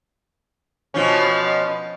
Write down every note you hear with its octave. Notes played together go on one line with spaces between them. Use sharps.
B2 F3 C#4